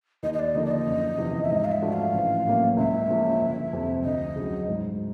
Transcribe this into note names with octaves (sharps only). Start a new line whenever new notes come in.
D#2 D#5
D#5
D5
D3 F3 A#3 D#4 D#5
D5
D#5
F#1
E2 C3 F3
E5
G#2 D#5
F5
E5
F3 A3 D4 F#4
F5
A1
A2 F#3 A#3 C#4
C#2 E5
C#3 F3 A#3 C#4
G1
F2 C3
D2 D#5
C#3 F#3
G#2